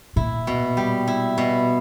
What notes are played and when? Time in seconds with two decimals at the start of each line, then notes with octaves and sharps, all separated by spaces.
0.16 A#2 E4
0.47 B2
0.77 G3
1.07 E4
1.38 B2